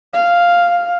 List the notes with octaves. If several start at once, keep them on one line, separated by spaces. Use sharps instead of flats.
F5